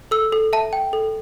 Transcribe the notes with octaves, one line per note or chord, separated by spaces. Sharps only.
A4 E6
A4
E5 A5
G5
A4